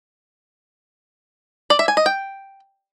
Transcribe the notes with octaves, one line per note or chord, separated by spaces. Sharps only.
D5
E5
G#5
D#5
G5